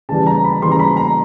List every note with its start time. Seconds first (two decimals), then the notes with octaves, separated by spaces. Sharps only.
0.09 C#3 E3 G3 A5
0.27 A#5
0.44 B5
0.62 C#3 E3 G3 C6
0.72 A#5
0.79 B5
0.97 A#5